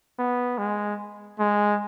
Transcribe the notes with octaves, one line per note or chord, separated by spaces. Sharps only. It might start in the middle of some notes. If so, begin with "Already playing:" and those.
B3
G#3
G#3